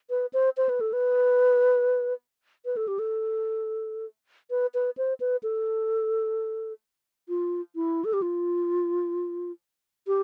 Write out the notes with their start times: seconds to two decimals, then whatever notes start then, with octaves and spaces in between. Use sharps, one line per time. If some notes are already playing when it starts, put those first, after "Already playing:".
0.10 B4
0.33 C5
0.57 C5
0.69 B4
0.81 A4
0.93 B4
2.66 B4
2.77 A4
2.88 G4
2.99 A4
4.50 B4
4.74 B4
4.97 C5
5.20 B4
5.43 A4
7.29 F4
7.75 E4
8.05 A4
8.13 G4
8.22 F4
10.07 G4